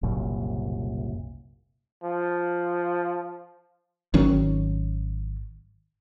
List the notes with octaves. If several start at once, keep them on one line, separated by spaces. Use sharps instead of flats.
F#1 C2 F#2 A#2
F3
G#1 D#3 F#3 C#4